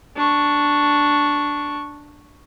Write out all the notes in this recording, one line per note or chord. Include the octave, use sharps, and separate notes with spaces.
D4 C#6